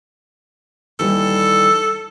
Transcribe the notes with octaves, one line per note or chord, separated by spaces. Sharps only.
D#2 E3 G3 A4